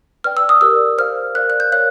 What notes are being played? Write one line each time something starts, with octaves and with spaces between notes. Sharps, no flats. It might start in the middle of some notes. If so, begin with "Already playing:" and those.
B4 D5 G5 F6
E6
D#6
G4 A#4 D5 E6
C5 F5 F6
A#4 D5 F5 F#6
F#6
G6
A#4 C#5 F5 F#6